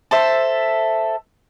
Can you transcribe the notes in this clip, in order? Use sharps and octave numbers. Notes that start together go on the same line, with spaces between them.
A4 C5 E5